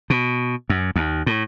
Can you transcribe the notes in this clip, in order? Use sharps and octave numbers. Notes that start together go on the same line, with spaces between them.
B2
F#2
D#2
A2